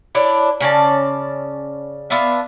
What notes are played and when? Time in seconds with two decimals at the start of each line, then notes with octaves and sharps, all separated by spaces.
0.15 D4 E4 C#5 D5
0.60 C#3 C#4 D5 A5
2.10 B3 D4 F4 E5